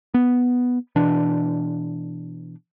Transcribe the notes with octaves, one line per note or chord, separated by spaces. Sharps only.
B3
B2 E3 D4